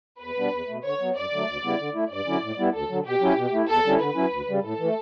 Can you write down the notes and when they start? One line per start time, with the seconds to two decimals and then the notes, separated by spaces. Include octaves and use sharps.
0.20 E2 B4
0.37 B2 G3 B3 D4
0.52 E2
0.67 B2 A3
0.84 D3 C#5
1.00 F#3 B3
1.15 F#2 D5
1.32 D3 F#3 A3
1.48 D2
1.63 C#3 G3 B3 E4
1.79 D3
1.94 A3 E4
2.11 G2 D5
2.26 D3 F#3 C#4 E4
2.42 A2
2.58 G3 B3 E4
2.74 D2 A4
2.90 D3 F#3
3.05 B2 G4
3.21 F#3 C#4 E4
3.36 B2
3.52 A3 E4
3.68 E2 A4
3.84 D3 G3 C#4 E4
4.00 D3 B4
4.16 F#3 C#4 E4
4.31 D2
4.48 C#3 G3
4.64 A2 A4
4.79 E3
4.84 A3